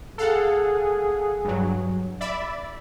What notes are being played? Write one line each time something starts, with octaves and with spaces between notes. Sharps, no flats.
G#4 A4 F5 F#5
G2 F#3
D5 E5 B5